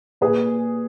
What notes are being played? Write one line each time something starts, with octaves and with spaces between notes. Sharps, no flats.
A#2 G#4 B4